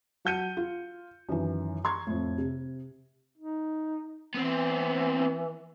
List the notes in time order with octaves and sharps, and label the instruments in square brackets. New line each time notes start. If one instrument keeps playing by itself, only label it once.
[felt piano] F#3 F#5 A5 G6 C#7 D#7
F4
F#2 D#3 E3
A#5 C6 C#6 G#6
F2 A2
C3
[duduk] D#4
[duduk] E3 [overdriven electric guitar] B3 C4